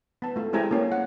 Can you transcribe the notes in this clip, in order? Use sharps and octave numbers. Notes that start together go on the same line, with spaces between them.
B3 A5
A3 F4
G#3 C4 E4 G4 G#5 A#5
A#3 C#4 G4
F#5